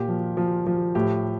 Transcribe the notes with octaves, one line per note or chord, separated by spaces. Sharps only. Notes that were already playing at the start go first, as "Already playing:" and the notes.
Already playing: A#2 G4
F3
F3
F3
A2 G4